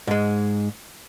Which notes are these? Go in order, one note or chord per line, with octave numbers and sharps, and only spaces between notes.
G#2 G#3